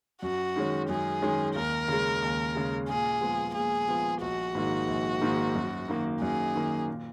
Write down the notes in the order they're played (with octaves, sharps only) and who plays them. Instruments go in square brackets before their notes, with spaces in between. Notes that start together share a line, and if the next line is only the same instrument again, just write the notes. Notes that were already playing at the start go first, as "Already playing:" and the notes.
[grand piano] F#2 [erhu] F#4
[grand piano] D#3 G#3 C#4
[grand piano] F#2 [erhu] G#4
[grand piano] D#3 G#3 C#4
[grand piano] D#2 [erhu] A#4
[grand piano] C#3 G#3
D#2
C#3 G#3
[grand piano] A#2 [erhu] G#4
[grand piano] F3 G#3 B3
[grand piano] A#2 [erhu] G#4
[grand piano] F3 G#3 B3
[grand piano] A#1 [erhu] F#4
[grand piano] G#2 D#3 A#3 D#4
A#1
G#2 D#3 A#3 D#4
F#2
D#3 A#3
[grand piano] F#2 [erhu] G#4
[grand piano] D#3 A#3
A#2